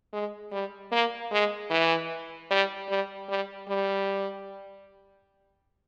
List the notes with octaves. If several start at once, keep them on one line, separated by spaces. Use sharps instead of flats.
G#3
G3
A#3
G#3
E3
G3
G3
G3
G3